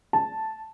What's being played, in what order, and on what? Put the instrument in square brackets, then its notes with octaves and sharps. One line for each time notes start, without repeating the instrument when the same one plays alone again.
[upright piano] A5